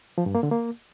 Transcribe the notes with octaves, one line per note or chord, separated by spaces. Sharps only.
F3
G2
A#3
D3
A#3